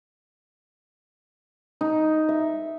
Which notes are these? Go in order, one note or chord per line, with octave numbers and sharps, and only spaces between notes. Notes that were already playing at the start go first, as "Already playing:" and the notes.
D#4
E5